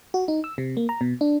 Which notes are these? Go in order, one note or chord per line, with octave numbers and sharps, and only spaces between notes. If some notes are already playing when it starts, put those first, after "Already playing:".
F#4
D#4
E6
C3
A#3
A#5
B2
D4